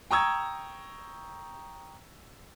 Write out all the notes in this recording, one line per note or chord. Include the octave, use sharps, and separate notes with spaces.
G5 A#5 C#6 D#6 E6 G#6